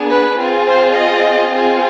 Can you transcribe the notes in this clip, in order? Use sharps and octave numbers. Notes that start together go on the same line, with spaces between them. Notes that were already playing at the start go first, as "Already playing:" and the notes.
Already playing: B3 D4 G#4
B4
C4 F4 G#4
C5
D#5
C4 F4 G#4